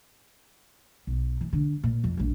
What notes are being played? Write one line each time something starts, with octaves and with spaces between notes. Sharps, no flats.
B1
E3
D3
A#2
F2
A#1 G2